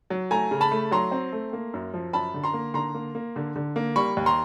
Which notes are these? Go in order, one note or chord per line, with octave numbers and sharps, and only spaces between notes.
F#3
A3 G#5 A#5
C#3
A5 B5
A3
F#3 A#5 C6
C4
A3
A#3
F#2
F3
F#2 A5 B5
D3
A#5 C6
A#3
D3 A#5 C6
A#3
A#3
D3
D3
A#3
G3 B5 C#6
D#2
A#5 C6